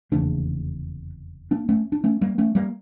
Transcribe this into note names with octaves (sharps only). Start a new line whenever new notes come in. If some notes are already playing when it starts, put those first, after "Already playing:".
F1 E2 C#3 A#3 D4
A#3 D4
A3 C#4
D4
A3 C#4
G3 A#3
A3 C#4
G3 A#3